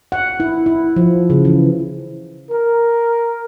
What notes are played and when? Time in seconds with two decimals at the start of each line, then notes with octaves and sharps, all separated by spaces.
0.12 F#5
0.40 E4
0.66 E4
0.96 F3
1.30 C#3
1.45 E3
2.50 A#4